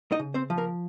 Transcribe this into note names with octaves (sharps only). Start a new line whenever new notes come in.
D#4 D#5
C#3
C4 C5
F3
A#3 A#4